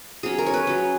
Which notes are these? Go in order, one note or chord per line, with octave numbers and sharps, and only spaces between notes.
F#3 C#4 G#4
A#4
C#5
B4
F#3 C#4